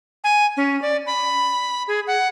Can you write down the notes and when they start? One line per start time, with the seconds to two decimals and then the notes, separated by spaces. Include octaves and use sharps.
0.24 G#5
0.57 C#4
0.82 D5
1.06 B5
1.88 G#4
2.07 F#5